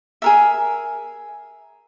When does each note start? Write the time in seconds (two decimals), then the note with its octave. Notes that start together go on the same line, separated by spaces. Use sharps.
0.22 G#4 A#4 E5